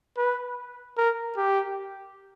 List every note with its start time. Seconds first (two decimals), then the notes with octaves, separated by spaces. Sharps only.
0.17 B4
0.97 A#4
1.37 G4